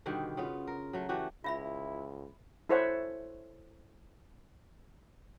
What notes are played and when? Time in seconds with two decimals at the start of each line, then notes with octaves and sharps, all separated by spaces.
0.06 B2 D3 D#3 G3
0.37 C#3 B3 F4
0.67 A#4
0.93 F#3 A3
1.09 E3 A3 F#4 G4
1.44 C#2 E4 F4 E5 B5
2.69 E4 A4 C5 C#5 E5 F#5